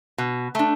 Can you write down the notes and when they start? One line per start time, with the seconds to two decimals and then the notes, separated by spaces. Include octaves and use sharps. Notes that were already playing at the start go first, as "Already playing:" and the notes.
0.18 B2
0.55 A3 D4